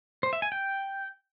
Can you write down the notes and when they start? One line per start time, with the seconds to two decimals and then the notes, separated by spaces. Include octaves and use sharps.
0.23 C5
0.33 E5
0.42 G#5
0.52 G5